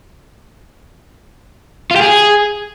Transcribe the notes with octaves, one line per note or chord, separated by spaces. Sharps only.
F4
G4
G#4